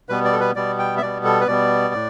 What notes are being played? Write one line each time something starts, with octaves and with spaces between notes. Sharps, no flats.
B2 G3 B3 B4
D5
A4
B4
B2 G3 B3 D5
G5
E5
B2 G3 B3 D5
A4
B4
B2 G3 B3 D5
A2